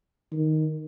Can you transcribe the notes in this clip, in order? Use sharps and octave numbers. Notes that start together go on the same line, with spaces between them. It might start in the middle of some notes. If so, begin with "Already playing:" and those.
D#3